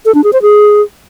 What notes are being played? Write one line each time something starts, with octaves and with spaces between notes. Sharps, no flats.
A4
D4
G#4
C5
G#4